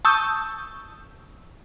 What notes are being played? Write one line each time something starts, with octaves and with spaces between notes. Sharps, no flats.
A5 C#6 D#6 E6 G6